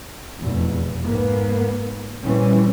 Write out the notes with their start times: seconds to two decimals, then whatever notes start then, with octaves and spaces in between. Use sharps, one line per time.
0.40 F1 E2 B2
1.03 G#2 A#3 B3
2.22 A#2 E3 G3 C4 C#4